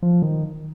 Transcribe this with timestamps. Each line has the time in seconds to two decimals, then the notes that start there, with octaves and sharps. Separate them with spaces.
0.02 F3
0.22 D#3